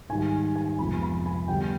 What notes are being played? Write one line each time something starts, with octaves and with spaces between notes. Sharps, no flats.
G#2 D#3 G3 G#5
G#5
F2 C3 F3 G#3 B3 B5
B5
G#5
D3 G3 B3 G5